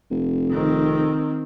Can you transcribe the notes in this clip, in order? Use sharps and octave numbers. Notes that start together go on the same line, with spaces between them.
F1
D#3 C4